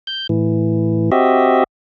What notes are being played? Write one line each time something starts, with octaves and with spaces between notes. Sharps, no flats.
G6
A2 E3
C4 F#4 G4 D#5 E5